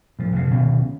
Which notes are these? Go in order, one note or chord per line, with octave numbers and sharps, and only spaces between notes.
A2 F3
F1 F2 C#3
D1 B2 D#3 C#4